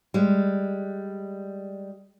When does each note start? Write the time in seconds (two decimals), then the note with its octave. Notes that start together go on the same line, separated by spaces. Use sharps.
0.14 G3 G#3